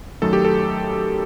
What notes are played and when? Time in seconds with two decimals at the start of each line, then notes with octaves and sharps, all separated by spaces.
0.22 F#2 D#3 F#3 A3 A4
0.33 G4
0.45 A4